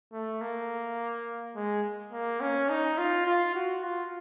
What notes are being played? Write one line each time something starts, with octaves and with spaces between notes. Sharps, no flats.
A3
A#3
G#3
A#3
C#4
D#4
F4
F4
F#4
F4